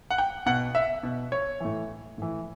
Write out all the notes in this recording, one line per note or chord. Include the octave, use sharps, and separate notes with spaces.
F#5
G5
B2 F#5
E5
B2
C#5
A2 E3
A2 E3